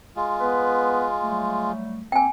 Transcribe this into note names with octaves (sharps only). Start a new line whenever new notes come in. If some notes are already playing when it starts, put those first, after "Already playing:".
G#3 F4
B3 B4
F#3 G3 A3
A#3 C4 G5 G#5